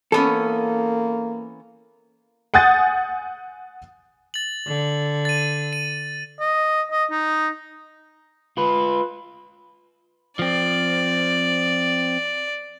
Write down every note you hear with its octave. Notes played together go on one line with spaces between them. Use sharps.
E3 A#3 B3 C#4 A4
F#5 G#5 D#6 G6 A6
A6 F#7
D3
A6 D#7
D#7
D#5
D#5
D#4
F4 B4
F3 C4 D5